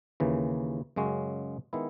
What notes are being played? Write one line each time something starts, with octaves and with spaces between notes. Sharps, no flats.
D#2 C#3 E3
F#2 C#3 G#3 C#4 F#4
D#3 G#3 B3 E4